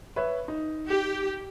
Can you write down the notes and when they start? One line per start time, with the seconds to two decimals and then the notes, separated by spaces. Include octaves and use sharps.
0.16 B4 C#5 E5
0.48 D#4
0.88 G4